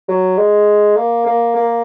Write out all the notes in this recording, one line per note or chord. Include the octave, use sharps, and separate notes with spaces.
F#3
G#3
A#3
A#3
A#3